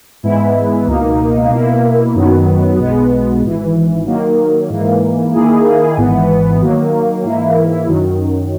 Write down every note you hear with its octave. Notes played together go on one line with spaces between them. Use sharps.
G#2 E3 G#3 B3 E4
C#2 B2 A#3 D#4
B2 A#3 E4
F#2 D#3 F#3 B3
B1 B2 G#3 B3
G#1 G#2 E3
D#3 F#3 A#3
G#2 E3 A#3
D#3 A#3 E4 G#4
G#1 G#2 E3 B3
D#3 F#3 A#3
G#2 E3 A#3 E4
F#2 D#3 F#3